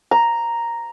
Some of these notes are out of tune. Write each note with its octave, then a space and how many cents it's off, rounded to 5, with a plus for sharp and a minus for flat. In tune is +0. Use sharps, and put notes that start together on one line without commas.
A#5 +0